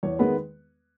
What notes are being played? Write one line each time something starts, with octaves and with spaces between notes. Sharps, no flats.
E2 C#5
D#3 G#3 B3 B4